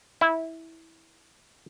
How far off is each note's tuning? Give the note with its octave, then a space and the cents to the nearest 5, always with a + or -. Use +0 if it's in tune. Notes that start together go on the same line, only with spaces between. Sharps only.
E4 -15